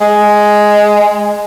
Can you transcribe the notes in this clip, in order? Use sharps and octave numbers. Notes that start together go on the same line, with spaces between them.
G#3